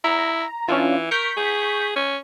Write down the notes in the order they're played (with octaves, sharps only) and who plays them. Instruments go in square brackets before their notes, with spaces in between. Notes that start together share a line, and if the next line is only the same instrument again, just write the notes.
[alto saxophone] E4 [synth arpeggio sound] A#5
[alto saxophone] E3 [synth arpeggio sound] C#4 D4 F4
[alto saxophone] A#4 [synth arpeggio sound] C#6 G6 B6
[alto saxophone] G#4
C#4